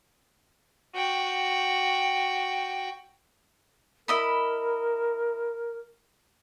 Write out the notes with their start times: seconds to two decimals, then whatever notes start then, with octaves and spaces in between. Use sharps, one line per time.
0.95 F#4 G5
4.08 E4 A#4 D#5 B5